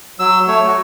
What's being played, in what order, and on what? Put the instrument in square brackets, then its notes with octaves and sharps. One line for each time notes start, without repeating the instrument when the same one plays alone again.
[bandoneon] F#3 E6
A3 C#5
F#4